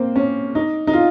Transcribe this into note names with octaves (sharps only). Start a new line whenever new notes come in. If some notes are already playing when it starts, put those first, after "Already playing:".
Already playing: A#3 C4
C#4
D#4
D#4
F4